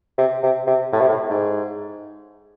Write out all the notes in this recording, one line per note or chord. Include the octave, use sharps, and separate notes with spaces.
C3
C3
C3
A2
C3
A2
G#2